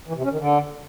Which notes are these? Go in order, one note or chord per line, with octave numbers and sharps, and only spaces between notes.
E3
C3
C#4
D#3
D3